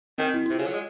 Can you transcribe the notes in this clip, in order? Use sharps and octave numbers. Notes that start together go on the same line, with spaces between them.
D#3 C4
E4
E4
C3 F4
C#3
F#3
G#3